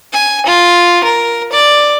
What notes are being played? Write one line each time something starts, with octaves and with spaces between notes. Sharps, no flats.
G#5
F4
A#4
D5